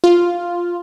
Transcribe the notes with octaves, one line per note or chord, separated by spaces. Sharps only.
F4